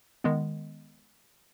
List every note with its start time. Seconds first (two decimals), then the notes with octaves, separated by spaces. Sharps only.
0.24 D#3 G#3 B3